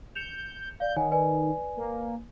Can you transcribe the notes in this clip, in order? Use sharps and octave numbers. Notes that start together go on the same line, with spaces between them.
G6 C#7 E7 F7
D5 F5 G6
D#3 C#5 F#5 G#5
B4 D5 G#5
A#3